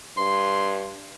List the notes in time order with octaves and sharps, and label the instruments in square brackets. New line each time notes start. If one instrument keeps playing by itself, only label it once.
[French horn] G2 [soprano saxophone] C6